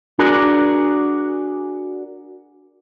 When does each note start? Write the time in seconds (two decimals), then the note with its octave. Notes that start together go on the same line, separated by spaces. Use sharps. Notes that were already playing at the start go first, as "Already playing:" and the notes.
0.19 D4 F#4 G#4 A#4 D5